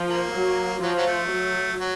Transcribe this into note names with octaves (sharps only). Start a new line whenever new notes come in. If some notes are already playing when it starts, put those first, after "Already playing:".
Already playing: F3
A#3
F#3
F3 F#3
F#3
A3
F#3
F#3